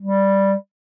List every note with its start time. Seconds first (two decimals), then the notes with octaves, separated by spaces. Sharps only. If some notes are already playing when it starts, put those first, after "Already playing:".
0.01 G3